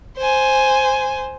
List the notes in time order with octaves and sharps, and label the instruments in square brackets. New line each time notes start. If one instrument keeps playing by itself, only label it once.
[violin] C5 G#5